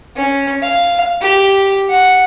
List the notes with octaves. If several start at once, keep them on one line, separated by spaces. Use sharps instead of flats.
C#4
F5
G4
F#5